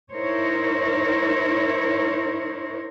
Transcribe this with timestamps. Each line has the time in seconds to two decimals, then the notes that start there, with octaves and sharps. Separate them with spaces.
0.12 D#4 E4 A#4 C5 C#5